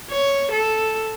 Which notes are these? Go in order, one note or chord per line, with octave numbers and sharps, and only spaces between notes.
C#5
A4